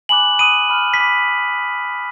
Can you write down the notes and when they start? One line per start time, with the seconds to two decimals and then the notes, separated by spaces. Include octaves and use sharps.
0.09 G#5 B5 D6 F#6 F#7
0.39 B5 D#6 F#6 D#7
0.70 B5 F6
0.94 B6
1.00 B5 D6